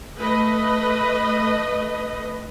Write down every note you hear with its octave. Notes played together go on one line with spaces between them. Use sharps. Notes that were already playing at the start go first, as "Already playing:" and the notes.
A3 B4 D#5